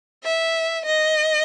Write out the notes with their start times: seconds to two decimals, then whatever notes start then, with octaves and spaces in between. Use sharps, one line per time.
0.24 E5
0.86 D#5